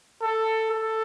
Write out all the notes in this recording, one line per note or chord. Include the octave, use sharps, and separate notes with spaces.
A4
A4